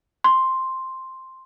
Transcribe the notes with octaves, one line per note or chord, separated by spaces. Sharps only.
C6